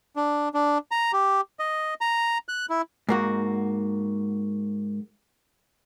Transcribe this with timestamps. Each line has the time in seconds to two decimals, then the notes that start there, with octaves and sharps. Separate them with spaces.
0.16 D4
0.54 D4
0.91 A#5
1.13 G4
1.59 D#5
2.01 A#5
2.49 F#6
2.70 E4
3.09 G#2 A#3 F#4